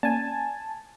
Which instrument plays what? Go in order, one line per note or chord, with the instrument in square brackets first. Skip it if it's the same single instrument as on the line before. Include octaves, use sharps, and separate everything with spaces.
[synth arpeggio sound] A#3 C#4 D5 [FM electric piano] G#5 A5